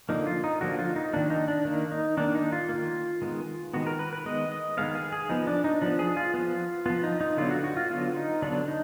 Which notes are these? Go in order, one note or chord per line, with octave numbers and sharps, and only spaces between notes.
D3 F3 A#3 D#4
F4
D#4
D3 F3 A#3 F#4
F4
D#4
D#3 A#3 D4
D#4
D4
D#3 A#3
D#4
D#3 A#3 D4
D#4
F4
D#3 A#3
D#3 G#3 B3
D#3 G#3 B3 F#4
A#4
B4
B4
D#3 G#3 B3 D#5
D#5
D#3 G#3 B3 F5
G#4
G#4
F3 B3 D#4
D4
D#4
F3 B3 D4
G#4
F4
F3 B3
F3 B3 F4
D#4
D#4
D3 F#3 B3 F4
F#4
F#4
F4
D3 F#3 B3 F4
D#4
D3 F#3 B3 D4
D#4